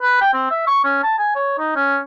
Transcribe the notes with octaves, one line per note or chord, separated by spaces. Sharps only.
B4
G5
C4
E5
C#6
C#4
A5
G#5
C#5
D#4
C#4